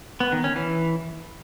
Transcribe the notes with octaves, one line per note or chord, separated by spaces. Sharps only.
B3
D#3
C#4
E3